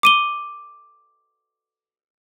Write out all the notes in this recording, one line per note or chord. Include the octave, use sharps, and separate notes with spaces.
D6 D#7 G7